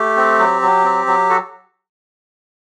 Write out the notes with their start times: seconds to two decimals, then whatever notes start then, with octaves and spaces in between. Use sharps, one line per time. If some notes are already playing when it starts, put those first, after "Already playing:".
Already playing: A3 G4
0.17 C4
0.39 F#3
0.62 F#3
0.84 C4
1.07 F#3
1.30 F#4 A4